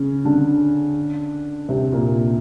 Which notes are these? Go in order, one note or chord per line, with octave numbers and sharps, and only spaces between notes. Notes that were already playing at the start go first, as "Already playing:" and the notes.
Already playing: C#3 C#4
D3 D4
C3 C4
A#2 A#3